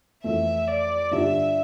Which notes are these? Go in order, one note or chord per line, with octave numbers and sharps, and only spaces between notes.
F2 E3 A3 E5
D5
G2 D3 G3 D4 F4 E5